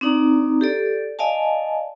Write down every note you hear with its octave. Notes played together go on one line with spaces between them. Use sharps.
C4 D4 D#4 D5 A#5
G4 A4 D5
D5 D#5 F5 G#5 A5